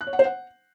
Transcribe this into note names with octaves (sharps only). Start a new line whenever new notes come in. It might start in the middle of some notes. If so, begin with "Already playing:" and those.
F#6
C#5
F#5
C5
F#5